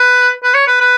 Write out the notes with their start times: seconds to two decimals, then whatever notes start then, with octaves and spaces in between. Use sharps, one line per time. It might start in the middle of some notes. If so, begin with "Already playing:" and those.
Already playing: B4
0.44 B4
0.54 C#5
0.67 B4
0.81 B4